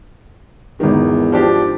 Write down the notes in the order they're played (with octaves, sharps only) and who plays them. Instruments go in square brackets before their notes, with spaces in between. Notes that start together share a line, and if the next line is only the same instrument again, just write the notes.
[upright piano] G#1 D#3 [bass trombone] E2
[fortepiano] F3 D4 G4